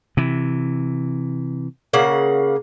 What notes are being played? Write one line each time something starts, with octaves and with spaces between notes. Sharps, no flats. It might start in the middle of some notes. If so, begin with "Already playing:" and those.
C3 E3
C#3 A#3 F#5